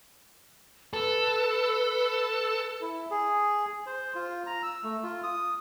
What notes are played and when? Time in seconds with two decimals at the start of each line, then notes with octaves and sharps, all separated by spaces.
0.93 A4 B4
2.81 E4
3.11 G#4
3.87 C5
4.15 F4
4.47 A#5
4.63 E6
4.84 A3
5.03 F4
5.23 D#6